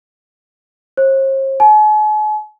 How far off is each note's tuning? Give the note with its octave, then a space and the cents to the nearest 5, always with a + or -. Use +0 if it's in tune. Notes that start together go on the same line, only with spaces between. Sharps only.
C5 +45
G#5 +45